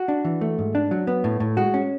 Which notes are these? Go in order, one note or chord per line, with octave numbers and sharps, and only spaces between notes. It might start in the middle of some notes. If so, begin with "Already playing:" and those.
Already playing: F#4
D4
E3
A3
G#2
D4
F#3
B3
A2
A2
G#3 F#4
C#4